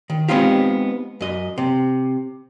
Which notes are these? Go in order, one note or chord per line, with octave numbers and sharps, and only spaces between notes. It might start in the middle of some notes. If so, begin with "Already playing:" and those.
D#3
G#3 B3 C4 D#4 F4 G4
F#2 D#5
C3